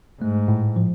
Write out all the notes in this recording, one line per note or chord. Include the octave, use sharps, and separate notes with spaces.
G#2 A3
A2
F3